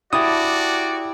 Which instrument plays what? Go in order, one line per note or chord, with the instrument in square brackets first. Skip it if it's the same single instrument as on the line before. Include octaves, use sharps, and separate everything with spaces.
[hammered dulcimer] E4 G4 A5 [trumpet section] F#4 D5 [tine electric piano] D#6